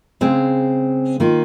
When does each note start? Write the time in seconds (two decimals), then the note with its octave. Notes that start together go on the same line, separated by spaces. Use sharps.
0.21 C#3 G#3 C4
1.20 D#3 A#3 F4